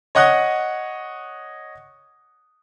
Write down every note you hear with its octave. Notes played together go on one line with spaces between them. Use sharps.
C#5 D#5 F#5 D#6 F#6